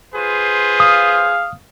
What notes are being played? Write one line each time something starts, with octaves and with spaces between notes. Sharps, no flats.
F4 G#4 B4 C5
F5 D#6